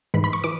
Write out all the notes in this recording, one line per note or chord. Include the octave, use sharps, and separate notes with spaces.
G#2 E3 B5
B5
C#6
E3 D6